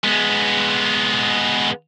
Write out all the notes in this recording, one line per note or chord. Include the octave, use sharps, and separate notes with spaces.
G#3 B3